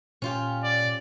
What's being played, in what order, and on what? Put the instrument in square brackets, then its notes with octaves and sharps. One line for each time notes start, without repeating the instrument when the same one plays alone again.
[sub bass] A#2 [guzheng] C#4 F4 G4
[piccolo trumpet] D5